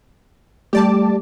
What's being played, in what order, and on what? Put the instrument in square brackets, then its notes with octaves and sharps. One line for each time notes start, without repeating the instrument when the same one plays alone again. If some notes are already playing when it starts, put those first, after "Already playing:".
[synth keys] G3 A3 [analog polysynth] G4 D5 A5